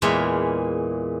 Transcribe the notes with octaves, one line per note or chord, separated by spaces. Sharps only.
E2 A#2 E3 G#3 C#5 E5